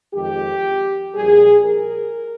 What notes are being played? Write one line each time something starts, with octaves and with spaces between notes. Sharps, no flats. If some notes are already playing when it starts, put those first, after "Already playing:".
F2 D#3 G#3 G4
A#1 A#2 G3 G#4
A#4